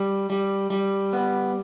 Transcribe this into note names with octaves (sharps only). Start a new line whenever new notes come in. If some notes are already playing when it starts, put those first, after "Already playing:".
Already playing: G3
G3
G3
B3